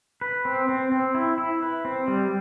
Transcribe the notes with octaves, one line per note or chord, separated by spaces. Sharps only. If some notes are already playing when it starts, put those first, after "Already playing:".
B4
C4
C4
C4
E4
E4
B4
C4
G3